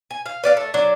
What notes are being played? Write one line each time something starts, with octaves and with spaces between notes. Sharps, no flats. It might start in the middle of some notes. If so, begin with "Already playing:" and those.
G#5
F5
B4 D5 F5
A3
F#3 D4